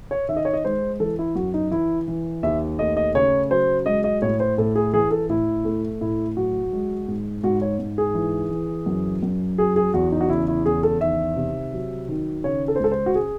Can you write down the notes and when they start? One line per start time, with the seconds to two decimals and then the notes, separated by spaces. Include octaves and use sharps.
0.11 C#5
0.29 D#3 E5
0.37 D#5
0.45 C#5
0.53 D#5
0.65 G#3 C5
1.00 E3 A4
1.19 E4
1.35 F#2 F#4
1.54 D#4
1.71 E3 E4
2.08 E3
2.43 D#2 E5
2.79 A3 D#5
2.97 D#5
3.15 C#3 C#5
3.50 F#3 C5
3.86 G#3 D#5
4.04 D#5
4.22 A2 C#5
4.40 C5
4.58 A2 A4
4.75 G#4
4.93 E3 G#4
5.11 A4
5.29 A2 E4
5.65 A3
6.01 A2 E4
6.37 F#3 F#4
6.73 G#3
7.08 G#2
7.43 G#2 F#4
7.62 C#5
7.79 G#2
7.98 G#4
8.15 E3
8.51 E3
8.86 F#2
9.23 F#2
9.58 F#3 G#4
9.76 G#4
9.94 E2 F#4
10.12 D#4
10.21 F#4
10.30 C#3 E4
10.48 E4
10.66 E2 G#4
10.83 A4
11.01 D#3 E5
11.36 C3
11.73 F#3
12.09 D#3
12.44 C#3 C#5
12.68 A4
12.76 C5
12.80 C#2 A4
12.92 C5
13.06 F#4
13.15 G#4